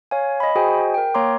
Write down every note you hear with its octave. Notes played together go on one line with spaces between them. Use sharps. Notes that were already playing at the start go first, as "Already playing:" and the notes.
C#5 F5 G#5
D#5 B5
F#4 G#4 C5 D#5 G5 G#5
A#4 G5
A#3 C#5 A#5 C6 D6